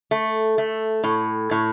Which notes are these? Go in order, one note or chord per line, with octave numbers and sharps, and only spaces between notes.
A3
A3
A2
A2